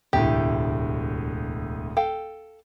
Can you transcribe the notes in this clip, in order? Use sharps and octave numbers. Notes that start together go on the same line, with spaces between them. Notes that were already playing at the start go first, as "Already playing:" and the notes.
E1 D2 A2 G4
A4 F5 G5